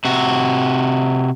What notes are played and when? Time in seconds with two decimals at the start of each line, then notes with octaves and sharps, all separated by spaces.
0.05 C3 F#4